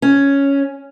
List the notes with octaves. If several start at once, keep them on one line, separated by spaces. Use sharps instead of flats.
C#4